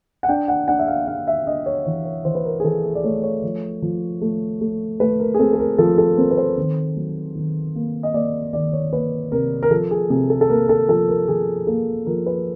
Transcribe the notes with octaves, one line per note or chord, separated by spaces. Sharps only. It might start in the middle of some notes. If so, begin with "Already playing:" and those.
F#5
D4 G5
F#5
D4 F#5
E5
F5
D4 F5
E5
D4 D#5
C#5
E3 C#5
C#5
E3 C5
B4
A#4
G#4
E3 A4
G#4
D5
A3 C#5
C#5
F3
F3
A3
A3
A3 B4
A#4
G#4
C4 A4
A4
A#4
F3 A4
A4
C4 A#4
B4
C5
D#3
F#3
D#3
A#3
D#5
A#3 D5
D#3 D5
C#5
A#3 B4
C3 A#4
A#4
F3 A4
G#4
C3 G#4
A4
A4
A#3 A#4
A4
F3 A4
A#4
F3 G#4
A#3 A4
F3 A#4
B4